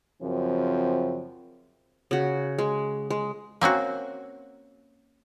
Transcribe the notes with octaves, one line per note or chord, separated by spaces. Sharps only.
F#2 C#3 F3 C4
C#3 F#4
G#3
G#3
A#3 C4 C#4 F#4